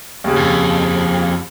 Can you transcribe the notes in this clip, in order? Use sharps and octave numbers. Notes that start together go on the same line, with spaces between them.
D#2 C#3
F2